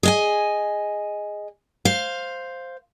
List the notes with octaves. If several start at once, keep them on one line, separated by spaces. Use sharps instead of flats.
G#4 D#5 G#5
C5 F5